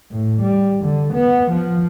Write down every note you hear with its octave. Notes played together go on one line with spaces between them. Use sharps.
A2
G3
D3
B3
F3